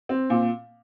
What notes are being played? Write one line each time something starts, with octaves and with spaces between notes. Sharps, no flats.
C4
A#2